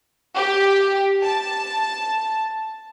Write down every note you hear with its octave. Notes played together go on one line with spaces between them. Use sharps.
G4
A5